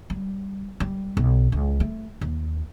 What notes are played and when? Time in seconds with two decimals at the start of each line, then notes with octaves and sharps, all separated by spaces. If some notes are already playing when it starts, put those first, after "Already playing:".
0.10 G3
0.80 G3
1.17 B1
1.52 C#2
1.80 A3
2.21 D#2